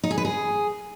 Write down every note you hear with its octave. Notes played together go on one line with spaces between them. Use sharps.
D#4
G#4
B4
G#4